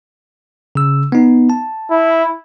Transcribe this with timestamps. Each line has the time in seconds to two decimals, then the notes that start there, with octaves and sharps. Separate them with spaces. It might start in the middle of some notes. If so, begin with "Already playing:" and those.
0.75 C#3 E6
1.12 B3 D#4
1.50 A5
1.91 E4